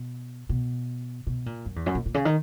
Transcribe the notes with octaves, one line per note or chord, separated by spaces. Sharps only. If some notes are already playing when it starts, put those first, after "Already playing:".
Already playing: B2
B2
B2
A#2
F#2
E2
F#2
A#2
A#2
C#3
D#3